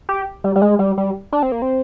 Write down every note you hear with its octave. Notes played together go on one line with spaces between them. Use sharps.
G4
G3
G3
G#3
G3
G3
D4
C4
A#3
C4